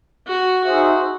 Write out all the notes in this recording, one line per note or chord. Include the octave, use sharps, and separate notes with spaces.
F#4
D#4 F#4 G#4 C5 E5